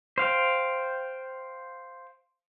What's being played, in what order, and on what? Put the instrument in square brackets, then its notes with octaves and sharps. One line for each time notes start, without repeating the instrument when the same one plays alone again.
[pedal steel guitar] C5 F5 G5